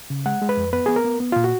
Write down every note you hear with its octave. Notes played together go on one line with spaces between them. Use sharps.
C#3
G#3 F#5
G#3
B4
F2
B3 B4
B3 G#4
A#4
B3
B3
A#2 F4
F#4